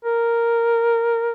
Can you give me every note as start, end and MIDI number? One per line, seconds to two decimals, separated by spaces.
0.05 1.32 70